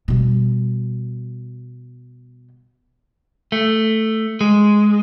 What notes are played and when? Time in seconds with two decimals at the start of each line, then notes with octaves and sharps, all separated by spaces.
0.08 B2 G3
3.52 A3
4.41 G#3